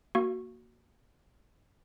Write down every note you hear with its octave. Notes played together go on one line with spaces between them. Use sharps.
A#3 F#4